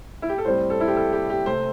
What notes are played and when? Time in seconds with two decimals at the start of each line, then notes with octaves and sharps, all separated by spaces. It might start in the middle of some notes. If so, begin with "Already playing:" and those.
0.22 E4
0.29 G4
0.38 A4
0.45 A2 G3 C4 C5
0.70 A4
0.81 E4
0.88 G4
0.96 A4
1.13 G4
1.30 G4
1.46 C3 A3 C4 C5